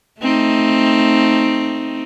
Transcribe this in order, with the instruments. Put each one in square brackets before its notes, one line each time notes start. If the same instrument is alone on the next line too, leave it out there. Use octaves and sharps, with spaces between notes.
[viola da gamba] A3 C4 D#4